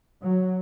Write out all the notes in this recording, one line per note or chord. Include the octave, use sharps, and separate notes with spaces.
F#3